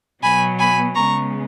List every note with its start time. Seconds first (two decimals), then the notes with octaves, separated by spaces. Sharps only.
0.22 B2 F#3 B3 G#5 B5
0.59 G#5 B5
0.95 C#3 G#3 B3 A#5 C#6